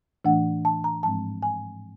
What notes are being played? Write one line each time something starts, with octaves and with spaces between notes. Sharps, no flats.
A2 E3 A3 D4 F#5
A5
A#5
G#2 F3 G#3 C4 A5
G#5